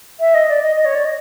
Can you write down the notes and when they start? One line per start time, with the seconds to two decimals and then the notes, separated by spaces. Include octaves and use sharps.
0.20 E5
0.34 D#5
0.48 D5
0.62 D#5
0.76 D#5
0.85 C#5
0.95 D5
1.05 D#5